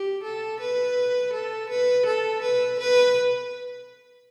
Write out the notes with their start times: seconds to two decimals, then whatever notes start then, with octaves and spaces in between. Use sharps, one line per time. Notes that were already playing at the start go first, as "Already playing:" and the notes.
Already playing: G4
0.23 A4
0.60 B4
1.33 A4
1.70 B4
2.06 A4
2.42 B4
2.79 B4